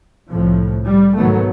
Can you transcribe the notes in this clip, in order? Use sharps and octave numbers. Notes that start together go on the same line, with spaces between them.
C2 F2 A2 F3
G3
G#2 B2 D#3 F#3 A3 B3